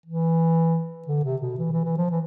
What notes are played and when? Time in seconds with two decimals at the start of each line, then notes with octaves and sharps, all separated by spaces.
0.06 E3
1.08 D3
1.25 C3
1.42 B2
1.59 E3
1.72 E3
1.85 E3
1.97 F3
2.11 E3